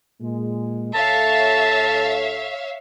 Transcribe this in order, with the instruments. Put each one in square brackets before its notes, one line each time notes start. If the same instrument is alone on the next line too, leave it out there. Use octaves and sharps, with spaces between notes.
[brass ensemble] A#2 G#3
[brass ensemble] D2 A4 [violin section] C#5 E5 F5 [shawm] A5